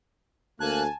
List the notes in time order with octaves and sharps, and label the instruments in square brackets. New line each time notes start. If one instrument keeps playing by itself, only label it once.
[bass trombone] D2 [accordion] A#3 F#6 [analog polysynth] G#5 A5